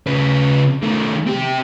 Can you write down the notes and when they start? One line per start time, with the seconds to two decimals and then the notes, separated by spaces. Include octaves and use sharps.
0.07 C#3 B4
0.83 D#3 A3
1.27 C4 G4